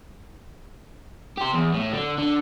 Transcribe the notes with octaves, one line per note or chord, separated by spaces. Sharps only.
G4 C5
E2
A2
D3
D3